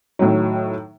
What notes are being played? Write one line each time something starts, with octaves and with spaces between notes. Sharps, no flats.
A2 D#3 F#3